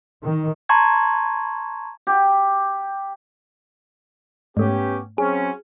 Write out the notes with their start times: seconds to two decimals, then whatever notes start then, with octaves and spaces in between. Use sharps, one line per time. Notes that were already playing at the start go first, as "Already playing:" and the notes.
0.21 D#3
0.69 A5 A#5 C6 C#6 G#6
2.07 G4
4.57 G#2 A3 B3 C#4 G4
5.18 F#3 C4 C#4 G#4